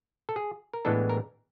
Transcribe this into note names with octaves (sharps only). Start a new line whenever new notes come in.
A4
G#4
A#4
A2 E3 G#3 B3 D4 A4
A#4